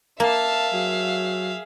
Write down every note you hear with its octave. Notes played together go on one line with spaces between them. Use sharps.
A#3 E5 F5 A5
F#3 G#4